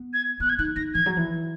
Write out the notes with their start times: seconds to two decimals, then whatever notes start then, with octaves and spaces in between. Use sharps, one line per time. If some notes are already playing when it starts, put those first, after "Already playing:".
Already playing: B3
0.14 G#6
0.40 B3 F#6
0.49 G#6
0.58 D#4 F#6
0.76 D#4 A#6
0.94 E3 G#6
1.06 F#3
1.17 E3